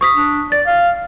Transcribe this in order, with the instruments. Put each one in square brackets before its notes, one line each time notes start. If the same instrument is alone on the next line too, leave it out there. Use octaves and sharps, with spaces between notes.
[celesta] C#6 D#6 B6
[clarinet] D4
[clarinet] D5 [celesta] A6
[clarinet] F5